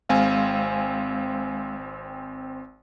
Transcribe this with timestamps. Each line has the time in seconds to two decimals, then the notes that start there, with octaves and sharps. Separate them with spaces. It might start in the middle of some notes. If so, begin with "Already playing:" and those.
0.09 G#1 G#3 C4 F5 G#5